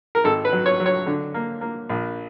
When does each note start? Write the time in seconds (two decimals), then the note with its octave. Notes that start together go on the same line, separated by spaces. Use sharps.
0.15 A#4
0.24 G#1 A4
0.45 B4
0.52 F#3
0.66 C#5
0.80 F#3
0.86 C#5
1.07 D3
1.34 A#3
1.61 A#3
1.89 A#1